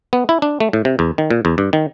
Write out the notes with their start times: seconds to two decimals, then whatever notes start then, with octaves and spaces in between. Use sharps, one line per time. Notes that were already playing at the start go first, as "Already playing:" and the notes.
0.13 B3
0.29 E4
0.42 D4
0.60 A3
0.73 A2
0.85 C3
0.99 E2
1.18 D#3
1.30 A#2
1.45 E2
1.58 G2
1.73 D#3